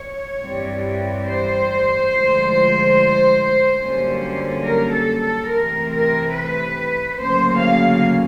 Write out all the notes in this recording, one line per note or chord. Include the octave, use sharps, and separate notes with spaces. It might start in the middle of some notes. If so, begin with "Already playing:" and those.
Already playing: C#5
G2 E3 G3 C4
C5
D2 D3 F3 G#3
F#2 D3 G3 A#3 C#4
A#4
A4
A4
C3 E3 A3 C4 A#4
A#4
B4
D2 C#3 F#3 A#3 C#4 C5
F5